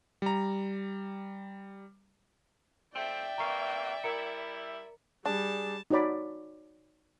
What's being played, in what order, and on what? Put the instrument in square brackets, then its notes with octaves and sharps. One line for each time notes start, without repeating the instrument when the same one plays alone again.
[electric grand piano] G3 A#5
[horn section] F3 A3 C4 [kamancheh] D5 E5 [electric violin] G5
[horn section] C3 E3 A#3 [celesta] A#5 C#6 C7
[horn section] G3 E4 [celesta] A#4 A#5 C#7
[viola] G3 [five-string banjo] D4 [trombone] G#4 [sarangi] A5
[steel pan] D#4 F#4 C#5 D5 B5